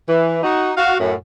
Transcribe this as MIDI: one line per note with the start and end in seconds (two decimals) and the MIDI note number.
0.07 0.39 52
0.43 0.72 63
0.43 0.72 66
0.76 0.95 66
0.76 0.95 77
0.99 1.13 42
0.99 1.13 45